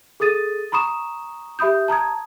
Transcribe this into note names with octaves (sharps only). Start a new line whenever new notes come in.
G#4 A4 D#6 A6 D#7
A#5 B5 C#6 D#6 E7
G4 E5 B5 D#6 G6
A5 A#5 D#6 G#6